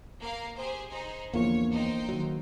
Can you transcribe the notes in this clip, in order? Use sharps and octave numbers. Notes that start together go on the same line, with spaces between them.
A#3 A#4 F5
G4 G#4 C5
D#4 G#4 C5
E2 D3 F3 A#3 C#5
D#4 C5 G5
D#3 F#3